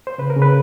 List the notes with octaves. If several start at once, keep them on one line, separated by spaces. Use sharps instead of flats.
C5
C#3 B4
A#4
C#3
B4